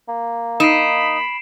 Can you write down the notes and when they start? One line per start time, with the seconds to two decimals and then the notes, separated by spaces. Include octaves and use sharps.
0.08 A#3
0.60 D#4 B5 C7 D7 E7